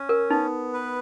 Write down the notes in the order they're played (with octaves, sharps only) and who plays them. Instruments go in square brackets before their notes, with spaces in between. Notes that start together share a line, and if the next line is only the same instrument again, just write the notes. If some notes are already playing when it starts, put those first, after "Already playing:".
Already playing: [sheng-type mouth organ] C#4
[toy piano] A#4
[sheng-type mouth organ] B3 [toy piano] D#4
[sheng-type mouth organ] B4